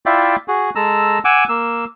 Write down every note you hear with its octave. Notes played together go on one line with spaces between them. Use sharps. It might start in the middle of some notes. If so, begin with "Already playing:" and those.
E4 F4 D5 E5 G5
F#4 G#4
G#3 A4 A#5 E6
F#5 G#5 D6 E6
A#3 E6